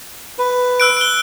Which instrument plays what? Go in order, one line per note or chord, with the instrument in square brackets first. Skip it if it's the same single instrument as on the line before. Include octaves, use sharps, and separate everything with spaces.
[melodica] B4
[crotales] E6 F#6 D7
D7 G7